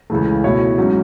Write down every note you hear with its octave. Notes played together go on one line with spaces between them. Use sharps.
C#2 C#3 E3 A3
B2 A3 E4 C#5
G#2 F#3 C#4